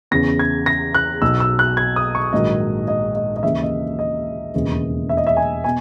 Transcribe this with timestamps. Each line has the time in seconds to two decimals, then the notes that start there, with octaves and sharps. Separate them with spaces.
0.11 E2 C#3 E3 A#6
0.39 G#6
0.66 A#6
0.94 F#6
1.22 B1 B2 F#3 E6
1.40 E6
1.59 F#6
1.77 G#6
1.96 D#6
2.15 C#6
2.33 A#1 G#2 D#3 F#3 D#5
2.88 D#5
3.15 D#5
3.36 D#5
3.43 D#2 C#3 E3 E5
3.62 D#5
3.99 D#5
4.54 E1 D#2 C#3 E3
5.09 E5
5.17 D#5
5.27 E5
5.37 G#5
5.64 B2 G#5